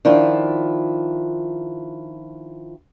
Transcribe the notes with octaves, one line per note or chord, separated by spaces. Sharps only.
D#3 F3 D4 E4 F4